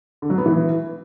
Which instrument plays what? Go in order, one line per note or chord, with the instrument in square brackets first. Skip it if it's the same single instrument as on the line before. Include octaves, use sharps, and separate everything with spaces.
[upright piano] D3
F#3
B3
E3